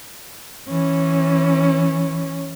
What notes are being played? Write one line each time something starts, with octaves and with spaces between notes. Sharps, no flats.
E3 C#4